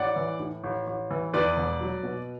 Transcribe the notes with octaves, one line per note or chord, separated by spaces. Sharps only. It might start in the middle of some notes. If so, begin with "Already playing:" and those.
Already playing: A1 D5 F#5
E3
A2
A1
A1
E3
E2 B4 D5
E1
F#3
B2